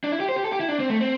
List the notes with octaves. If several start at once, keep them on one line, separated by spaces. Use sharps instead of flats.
D4
E4
G4
C5
G4
A4
G4
E4
D4
C4
A3
C4